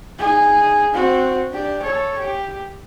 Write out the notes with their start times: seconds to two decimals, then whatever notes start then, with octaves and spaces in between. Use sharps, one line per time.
0.19 D#4 G#4
0.94 C4 F#4
1.50 D4 G4
1.83 A4 C#5
2.19 G4